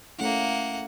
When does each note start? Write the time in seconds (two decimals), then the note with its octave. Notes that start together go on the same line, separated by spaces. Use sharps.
0.19 A3 A#3 C#4 E4 F#5